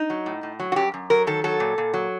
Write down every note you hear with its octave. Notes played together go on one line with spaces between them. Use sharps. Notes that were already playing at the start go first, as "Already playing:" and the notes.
Already playing: D#4
F#3
A2
A2
F#3
F#4
F#2 G4
F#2
F#3 A#4
D#3 A4
F#3 A4
A#2
A#2
F#3